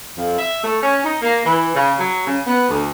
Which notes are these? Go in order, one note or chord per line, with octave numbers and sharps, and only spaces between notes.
F2
E5
A3
C#4
D#4
A#3
E3
C#3
F#3
C#3
B3
D2